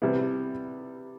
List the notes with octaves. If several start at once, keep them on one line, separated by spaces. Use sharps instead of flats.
C3 G3 B3 E4